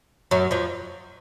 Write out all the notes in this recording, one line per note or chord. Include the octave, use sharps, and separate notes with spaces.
F#2 F#3
F2 F3